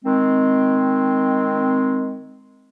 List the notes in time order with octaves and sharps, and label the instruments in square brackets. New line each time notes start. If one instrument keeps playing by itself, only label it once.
[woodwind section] D#3 G#3 C4